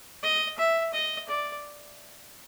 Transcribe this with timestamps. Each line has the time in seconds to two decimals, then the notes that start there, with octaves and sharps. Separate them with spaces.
0.23 D#5
0.58 E5
0.93 D#5
1.28 D5